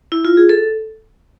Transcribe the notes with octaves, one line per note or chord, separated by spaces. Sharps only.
E4
F4
G#4
A4